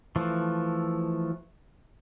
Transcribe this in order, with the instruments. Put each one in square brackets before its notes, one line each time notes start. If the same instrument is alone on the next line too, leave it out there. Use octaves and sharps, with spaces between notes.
[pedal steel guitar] E3 F3 A3